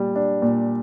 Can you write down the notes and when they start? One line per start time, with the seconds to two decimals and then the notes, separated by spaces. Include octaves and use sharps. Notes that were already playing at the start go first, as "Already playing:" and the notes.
Already playing: A#2 G3
0.16 D4
0.42 A#2